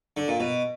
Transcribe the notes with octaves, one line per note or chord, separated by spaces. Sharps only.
D3
A#2
B2